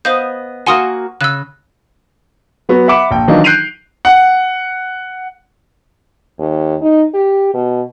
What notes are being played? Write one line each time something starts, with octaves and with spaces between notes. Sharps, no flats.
B3 C5 D#5 F5 G6
A#3 F#4 F#5 G#5 C6 D#6
C#3 E6 F#6
F#3 B3 F#4
E5 F#5 B5 D6 C#7 E7
A#1 G5
D#3 E3 F#3 D4 D#4 F4
F#6 G6 C7 D7 D#7 F7
F#5
D#2
D#4
G4
B2